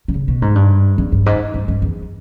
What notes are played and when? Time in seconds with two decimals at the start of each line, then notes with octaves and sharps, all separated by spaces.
0.08 D#3
0.14 C#3
0.28 B2
0.42 G#2
0.55 G2
0.98 E2
1.12 G2
1.26 G#2
1.54 G2
1.68 G2
1.82 E2